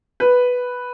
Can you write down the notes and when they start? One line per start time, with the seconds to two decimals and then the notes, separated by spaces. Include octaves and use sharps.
0.20 B4